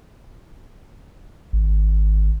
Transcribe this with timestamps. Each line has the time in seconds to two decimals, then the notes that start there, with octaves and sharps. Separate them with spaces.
1.53 G#1